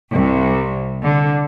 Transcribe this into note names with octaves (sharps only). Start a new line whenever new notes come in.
C2
D3